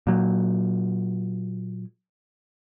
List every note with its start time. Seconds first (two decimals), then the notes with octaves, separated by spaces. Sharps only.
0.07 A#2 F#3